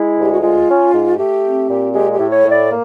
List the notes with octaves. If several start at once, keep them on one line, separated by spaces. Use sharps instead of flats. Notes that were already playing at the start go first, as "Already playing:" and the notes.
Already playing: G#3 E4
D2
G4
F#4
G#3 F4
C#4
G#2
A3 G4
C4
A#2
G#3 G4
G4
A2
C#5
A2
D5
A#3